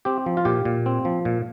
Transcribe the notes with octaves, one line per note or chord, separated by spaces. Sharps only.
C4 G4
F3
F4
A#2 G4
A#2
C4
F3
A#2